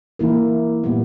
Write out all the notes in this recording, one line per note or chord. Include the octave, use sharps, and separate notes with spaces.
E3 A#3 E4 A#4
A#2 G3 B3